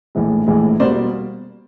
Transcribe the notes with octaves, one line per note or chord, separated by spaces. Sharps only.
A#1 A2 E3 G#3
A#1 A2 E3 G#3
B2 G3 A#3 C5 D5